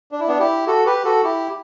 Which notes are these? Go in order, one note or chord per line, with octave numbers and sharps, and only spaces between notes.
D4
E4
B3 D4
E4 G4
F#4 A4
G4 B4
F#4 A4
E4 G4